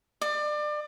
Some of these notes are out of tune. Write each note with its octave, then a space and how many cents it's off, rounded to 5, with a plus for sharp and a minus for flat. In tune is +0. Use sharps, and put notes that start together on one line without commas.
D5 +30